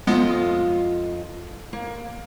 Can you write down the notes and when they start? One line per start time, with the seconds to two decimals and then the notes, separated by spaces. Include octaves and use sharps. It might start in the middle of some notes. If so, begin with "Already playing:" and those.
0.07 F2 G#3 B3 F4 D#5
1.73 A#3